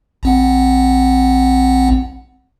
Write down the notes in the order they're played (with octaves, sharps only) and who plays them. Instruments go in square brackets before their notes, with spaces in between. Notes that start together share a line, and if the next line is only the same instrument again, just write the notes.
[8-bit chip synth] A#1 C4 F#5